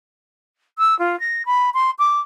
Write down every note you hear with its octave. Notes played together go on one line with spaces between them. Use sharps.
E6
F4
A#6
B5
C6
D6